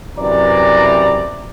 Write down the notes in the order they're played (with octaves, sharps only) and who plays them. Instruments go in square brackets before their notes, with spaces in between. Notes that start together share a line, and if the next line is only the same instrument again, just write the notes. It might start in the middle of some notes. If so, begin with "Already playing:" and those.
[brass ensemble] F#2 C3 E3 D5 A#5